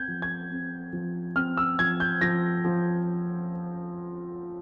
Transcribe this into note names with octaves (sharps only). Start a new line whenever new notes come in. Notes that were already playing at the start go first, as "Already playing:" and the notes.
Already playing: C4 G6 G#6
F3
G#6
C4
F3
C4 F6
E6
F3 G#6
G6
F3 A#6
F3